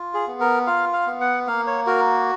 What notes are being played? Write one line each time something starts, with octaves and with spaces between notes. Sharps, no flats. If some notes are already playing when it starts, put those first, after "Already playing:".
Already playing: F4
G#4
B3
A#4
F4 F5
F5
B3
F#5
A#3 F5
C#5
F#4 A#4